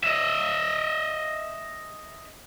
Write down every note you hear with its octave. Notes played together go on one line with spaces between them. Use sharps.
D#5 E5